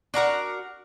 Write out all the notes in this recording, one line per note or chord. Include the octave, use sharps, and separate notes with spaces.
D4 F#4 A#4 F#5